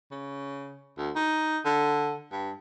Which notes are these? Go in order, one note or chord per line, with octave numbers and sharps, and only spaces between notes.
C#3
D2
D#4
D3
G2